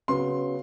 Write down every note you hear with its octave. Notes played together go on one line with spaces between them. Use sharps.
C#3 F#3 B3 C6